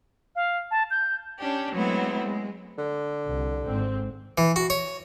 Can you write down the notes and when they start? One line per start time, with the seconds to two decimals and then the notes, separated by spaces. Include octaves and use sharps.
0.35 F5
0.71 A5
0.91 G6
1.40 C#4 D4 G4
1.73 F#3 G#3 A3 B3 C4 E4
2.21 G#3
2.78 D3
3.26 C2
3.66 G#1 G#2 C4
4.38 E3
4.56 F#4
4.70 C#5